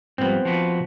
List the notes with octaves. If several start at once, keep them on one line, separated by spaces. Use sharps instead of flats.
G#2 F3 G3 B3 C4
F3 F#4 B4